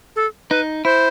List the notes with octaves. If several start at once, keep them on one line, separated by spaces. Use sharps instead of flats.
A4
D#4 B4
E4 C5